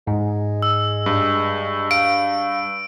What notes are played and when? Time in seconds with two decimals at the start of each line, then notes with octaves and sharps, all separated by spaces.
0.07 G#2 G#3
0.62 E6
1.06 G2
1.91 F5 D7